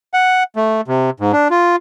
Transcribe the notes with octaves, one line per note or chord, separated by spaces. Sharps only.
F#5
A3
C3
G#2
D4
F4